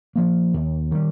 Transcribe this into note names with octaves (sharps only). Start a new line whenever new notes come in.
F3 A#3
D#2
D#3 G3